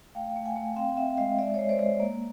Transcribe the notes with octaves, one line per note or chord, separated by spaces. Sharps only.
A3 F5 G5
A3
F#5 G#5
A3
C4 F5 G5
C4 E5 F#5
G#3 D#5 F5
G#3 D5 E5
C#5 D#5
G#3
C5 D5
G#3
A#3